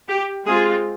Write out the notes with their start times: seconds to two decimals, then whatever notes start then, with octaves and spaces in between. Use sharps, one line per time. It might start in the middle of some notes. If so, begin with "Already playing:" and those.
0.08 G4
0.45 G#3 C4 F4 G#4